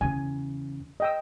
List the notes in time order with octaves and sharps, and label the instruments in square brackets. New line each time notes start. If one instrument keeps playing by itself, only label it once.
[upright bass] E2 C#3 [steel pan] G#5
[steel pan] D#5 G5 E6